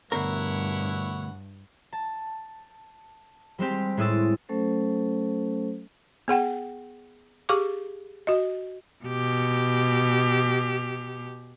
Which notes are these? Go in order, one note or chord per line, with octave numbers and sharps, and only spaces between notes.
D2 G2 B2 E4 A#4 C#5 F#5
A5
G3 G#3 C4 G4
A2 G#3 E4 D#6 E6 A6
F#3 A3 C#4 A4 C5
B3 G#4 F#5 G5
G4 G#4 F5 C#6 D6
F#4 D#5
B2 G4